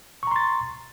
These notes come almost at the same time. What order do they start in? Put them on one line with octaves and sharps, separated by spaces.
C#6 A#5 C6 A6